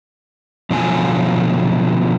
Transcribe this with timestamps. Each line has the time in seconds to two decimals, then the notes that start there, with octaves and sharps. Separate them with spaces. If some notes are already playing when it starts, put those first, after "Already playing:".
0.70 B2 D3 F3 F#3 F4 G#5